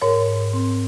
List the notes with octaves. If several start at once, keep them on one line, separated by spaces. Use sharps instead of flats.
G#2 A#4 C#5
G#2
C4